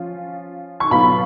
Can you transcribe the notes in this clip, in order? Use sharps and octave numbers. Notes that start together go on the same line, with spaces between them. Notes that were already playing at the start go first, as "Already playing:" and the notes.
Already playing: F3 C#4 F4
C#6
B2 F#3 B3 F4 B5